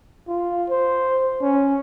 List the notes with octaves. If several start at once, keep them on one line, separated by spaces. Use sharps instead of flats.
F4
C5
C#4